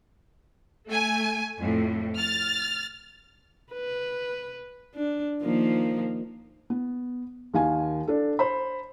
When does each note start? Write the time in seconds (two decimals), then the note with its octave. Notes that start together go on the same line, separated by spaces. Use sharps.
0.88 A3 G#5
1.58 F2 A2
2.18 F6 A6
3.73 B4
4.95 D4
5.42 D#3 F3 A#3
6.70 B3
7.54 D#2 D#3 F5 G#5
8.08 D4 A4
8.39 C5 B5